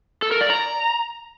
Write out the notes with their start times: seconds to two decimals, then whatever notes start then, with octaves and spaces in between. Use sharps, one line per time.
0.22 A4
0.32 A#4
0.41 D5
0.50 A#5